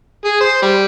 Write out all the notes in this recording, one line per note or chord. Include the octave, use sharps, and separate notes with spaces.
G#4
C5
G3